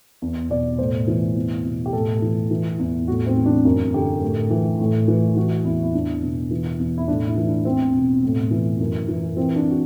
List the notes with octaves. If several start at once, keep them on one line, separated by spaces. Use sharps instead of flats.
E2
B2 D5
A2 C5
E3
E2
B2
G4
A2 A4
E3
E3
E2
A2 F#4
C4
E3
D4
F#2
D3 G4
A2
E3
A2
E3
E3 F#4
E2 E4
E4
E2 D4
B2
E3
E2
E4
A2 D4
E4
E3
D4
E2 C4
B2
A2
E3
F#2
E3
E3 C4
D4
F#4